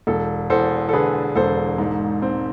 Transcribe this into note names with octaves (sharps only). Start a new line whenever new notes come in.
E1 A4
E2 A4 C5
A4
D3 G#4 B4
E1 A4 C5
G#2
C4